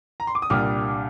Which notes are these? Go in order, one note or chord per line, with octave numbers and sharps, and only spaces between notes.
A#5
C6
D6
D#6
C2 A#2 G3 D4 D6 F6